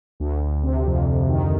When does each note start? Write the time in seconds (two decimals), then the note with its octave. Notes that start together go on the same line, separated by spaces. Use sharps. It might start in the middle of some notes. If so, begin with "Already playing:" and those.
0.20 D2
0.41 D2
0.63 C3
0.86 F2
1.08 F2
1.29 D#3